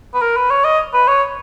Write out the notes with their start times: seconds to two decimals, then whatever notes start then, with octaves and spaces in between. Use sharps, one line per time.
0.14 B4
0.22 A#4
0.37 B4
0.50 C#5
0.64 D#5
0.94 B4
1.08 C#5